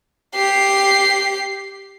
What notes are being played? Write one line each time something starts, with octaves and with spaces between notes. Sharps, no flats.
G4 C7